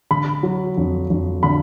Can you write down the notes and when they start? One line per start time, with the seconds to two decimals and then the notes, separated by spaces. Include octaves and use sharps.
0.11 D3 B5
0.43 F#3
0.77 F2
1.10 F2
1.43 D3 B5